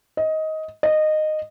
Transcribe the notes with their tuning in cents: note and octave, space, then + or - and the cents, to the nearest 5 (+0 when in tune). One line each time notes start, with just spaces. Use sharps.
D#5 +15
D#5 -15